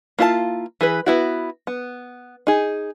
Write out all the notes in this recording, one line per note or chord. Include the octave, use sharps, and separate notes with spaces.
A#3 E4 F4 B4 A5
E3 G#4 B4
B3 E4 F#4
B3
D#4 G#4